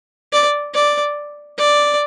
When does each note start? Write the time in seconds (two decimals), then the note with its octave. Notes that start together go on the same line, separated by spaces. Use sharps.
0.33 D5
0.74 D5
1.58 D5